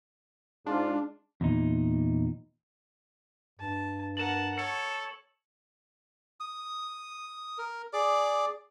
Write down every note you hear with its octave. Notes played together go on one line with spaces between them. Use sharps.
G#2 G#3 D4 F4
E2 A#2 D#4
G2 A5
A#4 F#5 A5 E7 F#7
A4 C#5 C#7
D#6
A#4
G#4 D5 D6